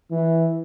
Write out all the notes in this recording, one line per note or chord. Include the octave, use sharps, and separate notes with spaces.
E3